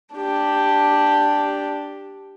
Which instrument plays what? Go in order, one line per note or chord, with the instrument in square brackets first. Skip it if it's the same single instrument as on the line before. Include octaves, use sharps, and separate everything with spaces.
[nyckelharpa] D4 G4